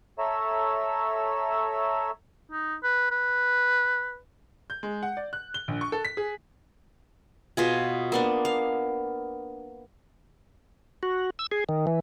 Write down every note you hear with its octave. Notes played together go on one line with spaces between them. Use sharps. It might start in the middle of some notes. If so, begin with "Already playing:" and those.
A4 C#5 E5 A#5 E6
D#4
B4
B4
G6
G#3
F#5
D5
F#6
G7
A#1
C#6
A4
B6
G#4
B2 F4 G#4
A#3 B3 D4
F5
F#4
E6
G#4
D#3
E3